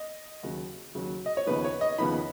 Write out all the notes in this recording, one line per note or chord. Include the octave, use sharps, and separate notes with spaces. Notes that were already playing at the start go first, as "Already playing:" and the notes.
Already playing: D#5
D#2 C#3 F#3
D#2 C#3 F#3
D#5
C#5
D#2 C#3 F3 B3 D#4 B4
C#5
D#5
D#2 C#3 F3 B3 D#4 B5